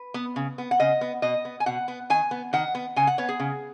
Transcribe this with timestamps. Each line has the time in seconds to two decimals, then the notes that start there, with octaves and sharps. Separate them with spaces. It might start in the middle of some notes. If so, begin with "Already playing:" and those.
Already playing: B4
0.14 B3
0.36 C#3
0.58 B3
0.71 F#5
0.80 C#3 D#5
1.01 B3
1.22 B2 D#5
1.45 B3
1.60 G#5
1.66 B2 F#5
1.88 B3
2.10 D#3 G#5
2.31 B3
2.53 D#3 F#5
2.75 B3
2.96 C#3 G#5
3.07 F#5
3.18 B3 C#5
3.29 G#4
3.40 C#3